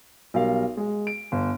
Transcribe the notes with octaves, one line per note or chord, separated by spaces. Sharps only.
B1 G3 A#4 F5
G#3
D7
G1